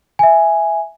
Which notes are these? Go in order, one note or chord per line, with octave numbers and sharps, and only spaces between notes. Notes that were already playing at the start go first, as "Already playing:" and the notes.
E5 G#5